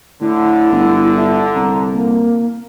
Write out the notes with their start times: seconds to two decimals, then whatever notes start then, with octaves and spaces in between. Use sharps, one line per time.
0.21 A2 D3 E4
0.72 G1
1.16 E5
1.55 C2 A#5
1.93 A#3